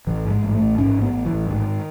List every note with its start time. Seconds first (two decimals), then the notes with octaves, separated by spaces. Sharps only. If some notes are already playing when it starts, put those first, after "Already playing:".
0.07 A1 E3
0.25 G#2
0.31 G#3
0.42 A1
0.55 A3
0.60 A1
0.78 G#2 C#4
0.96 A1
1.02 B3
1.14 A1
1.25 E3
1.31 A1
1.49 G#2 D#3